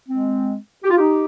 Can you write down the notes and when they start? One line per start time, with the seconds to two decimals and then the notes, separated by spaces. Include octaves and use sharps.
0.08 G#3 C4
0.84 G4
0.90 F4
0.97 D#4 G4